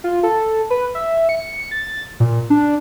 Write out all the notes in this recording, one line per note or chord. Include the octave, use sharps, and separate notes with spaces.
F4
A4
B4
E5
C#7
A6
A#2
D4